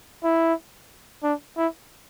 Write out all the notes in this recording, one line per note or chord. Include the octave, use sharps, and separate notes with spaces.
E4
D4
E4